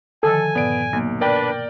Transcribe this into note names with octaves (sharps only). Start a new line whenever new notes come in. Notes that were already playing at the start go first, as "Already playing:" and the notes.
D3 D#3 F3 A4 G#5
G2 A#2 B3 D5 D7
B1 B2 A#3 B3
D4 A#4 B4 D5 G5